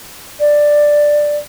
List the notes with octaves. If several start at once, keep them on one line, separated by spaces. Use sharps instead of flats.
D5